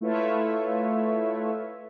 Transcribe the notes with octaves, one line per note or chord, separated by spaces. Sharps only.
A3 E4 F4 B4 C#5 E5